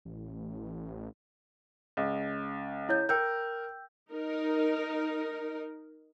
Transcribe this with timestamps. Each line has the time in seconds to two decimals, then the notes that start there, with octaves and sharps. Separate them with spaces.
0.05 A1
1.97 C#2
2.89 E4 C#5 G6
3.09 A#4 G5 E6 G6
4.11 D#4 A#4